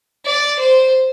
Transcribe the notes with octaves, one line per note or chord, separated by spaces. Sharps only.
D5
C5